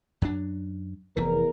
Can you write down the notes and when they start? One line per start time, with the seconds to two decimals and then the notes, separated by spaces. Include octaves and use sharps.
0.22 F#2 F#3 D4
1.17 F1 E2 E3 A#4